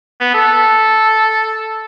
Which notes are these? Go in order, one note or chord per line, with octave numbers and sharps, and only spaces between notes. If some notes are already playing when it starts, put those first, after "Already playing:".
B3
A4